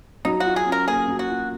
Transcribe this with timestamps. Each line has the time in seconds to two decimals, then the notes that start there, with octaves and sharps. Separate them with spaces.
0.25 F#3 D#4
0.40 F#4
0.46 F4
0.56 G#4
0.66 C#4
0.72 A#4
0.87 A#3 G#4
1.08 F#3
1.19 F#4
1.30 F4